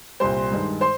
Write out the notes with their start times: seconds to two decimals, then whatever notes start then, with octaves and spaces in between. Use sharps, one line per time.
0.20 C2 A#2 G3 C5 C6
0.52 G2 D#3 G#3
0.81 C5 C6